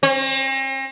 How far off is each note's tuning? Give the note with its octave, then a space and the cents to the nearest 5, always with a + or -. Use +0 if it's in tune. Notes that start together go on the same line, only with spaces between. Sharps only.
C4 +45